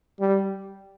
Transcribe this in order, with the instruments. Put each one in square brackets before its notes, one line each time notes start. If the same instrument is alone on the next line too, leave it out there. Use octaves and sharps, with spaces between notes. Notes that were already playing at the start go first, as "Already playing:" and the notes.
[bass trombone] G3